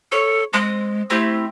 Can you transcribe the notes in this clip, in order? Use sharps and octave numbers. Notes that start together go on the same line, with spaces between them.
A4 C#5
G#3 C4 D#6 F#6
A3 C4 E4 G4